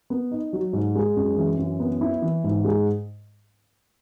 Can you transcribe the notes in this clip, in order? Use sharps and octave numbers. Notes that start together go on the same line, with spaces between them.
B3
D#4
F#3
G#2
G#3
F#2
E3
F#2
B3
E4
E3
G#2
G#3